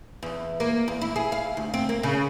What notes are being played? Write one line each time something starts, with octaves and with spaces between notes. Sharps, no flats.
E2
A#3
E2
E4
G#4
F5
D2
C4
A#3
C#3